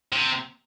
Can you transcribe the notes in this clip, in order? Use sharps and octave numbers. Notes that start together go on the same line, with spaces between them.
C3